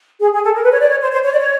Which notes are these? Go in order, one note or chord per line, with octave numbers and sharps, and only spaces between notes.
G#4
G#4
A4
A#4
B4
C#5
D5
C#5
C5
C5
C#5
D5
C#5